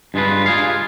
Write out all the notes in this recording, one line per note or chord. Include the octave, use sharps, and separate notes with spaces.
G2 G#3 F4 B4
F4 G#4 F5